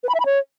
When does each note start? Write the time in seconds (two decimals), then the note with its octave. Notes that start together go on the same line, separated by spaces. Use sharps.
0.03 B4
0.09 B5
0.15 E5
0.20 B5
0.26 C#5